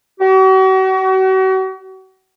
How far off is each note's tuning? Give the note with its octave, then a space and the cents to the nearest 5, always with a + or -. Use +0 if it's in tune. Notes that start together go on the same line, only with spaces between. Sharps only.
F#4 +40